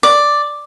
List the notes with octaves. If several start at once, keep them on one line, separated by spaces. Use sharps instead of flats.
D5